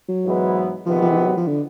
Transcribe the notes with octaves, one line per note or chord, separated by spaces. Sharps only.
F#3
G#2 E3 G#3 B3 E4
C3 D#3 F3 G#3 B3
F3
E3
F3
F#3
F3
D3